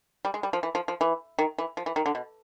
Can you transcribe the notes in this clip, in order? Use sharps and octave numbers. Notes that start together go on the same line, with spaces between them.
G3
G#3
G3
F3
E3
F3
F3
E3
D#3
E3
F3
E3
D#3
D3
B2